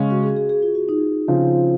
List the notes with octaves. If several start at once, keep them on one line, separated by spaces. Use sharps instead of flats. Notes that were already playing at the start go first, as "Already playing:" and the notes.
Already playing: C#3 G#3 C#4
F#4
G#4
G#4
G#4
F4
F#4
D#4
C#3 F3 C4